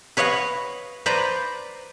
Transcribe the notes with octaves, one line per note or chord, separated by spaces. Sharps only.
B4 C#5 D#5 F5 F#5
B4 C5 D5 A#5